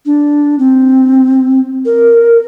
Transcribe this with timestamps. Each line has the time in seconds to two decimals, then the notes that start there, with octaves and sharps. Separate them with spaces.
0.06 D4
0.59 C4
1.85 A#4